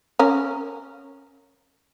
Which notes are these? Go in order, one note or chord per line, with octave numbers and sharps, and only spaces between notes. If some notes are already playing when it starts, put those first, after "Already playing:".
C#4 A#4